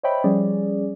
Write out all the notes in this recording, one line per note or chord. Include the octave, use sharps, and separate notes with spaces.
C5 C#5 D#5 E5 G5 B5
F3 G3 C#4 G#4 D5